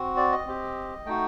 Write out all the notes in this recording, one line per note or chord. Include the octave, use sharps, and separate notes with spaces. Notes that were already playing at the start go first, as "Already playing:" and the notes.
Already playing: C4 F#4
D5
D#5
C4 G4
A3 D#4 F#4 G5